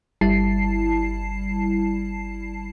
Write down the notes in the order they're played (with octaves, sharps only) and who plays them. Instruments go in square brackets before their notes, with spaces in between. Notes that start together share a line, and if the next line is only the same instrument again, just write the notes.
[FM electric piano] G1 G3 E4 A5 C7